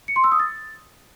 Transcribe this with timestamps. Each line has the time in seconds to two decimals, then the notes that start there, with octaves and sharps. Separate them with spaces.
0.08 C#7
0.16 C6
0.24 E6
0.32 D#6
0.40 A6